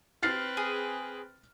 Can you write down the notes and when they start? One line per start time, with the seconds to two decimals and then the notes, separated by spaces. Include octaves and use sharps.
0.23 C4 B4 F6 A6 C7
0.57 G#4